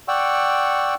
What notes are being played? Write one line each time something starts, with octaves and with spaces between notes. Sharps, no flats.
D5 F#5 G5 C#6 E6